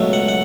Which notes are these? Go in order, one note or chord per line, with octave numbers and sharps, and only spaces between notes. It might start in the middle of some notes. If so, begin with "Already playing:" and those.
Already playing: C#2 B2 F#3 A3
F#5
F#5